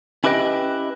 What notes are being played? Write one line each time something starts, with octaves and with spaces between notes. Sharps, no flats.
C#4 E4 G4 B4 D#5 G5